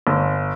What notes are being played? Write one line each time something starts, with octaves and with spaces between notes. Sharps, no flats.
G1